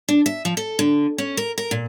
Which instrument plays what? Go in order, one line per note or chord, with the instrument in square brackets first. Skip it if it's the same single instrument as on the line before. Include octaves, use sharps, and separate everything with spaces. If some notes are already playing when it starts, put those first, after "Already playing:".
[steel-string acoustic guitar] D4
E5
F3
A4
D3
C#4
A#4
A#4
A#2